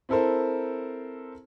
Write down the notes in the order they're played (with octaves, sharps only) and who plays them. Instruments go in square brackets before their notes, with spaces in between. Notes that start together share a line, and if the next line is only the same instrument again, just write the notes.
[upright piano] C4 E4 A4 A#4 C5